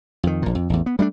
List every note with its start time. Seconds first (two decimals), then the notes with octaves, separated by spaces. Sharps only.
0.23 F2 D#3
0.42 A#1 A#2
0.55 F2
0.70 A1 E2
0.86 B3
0.99 G3 A3 C#4 D4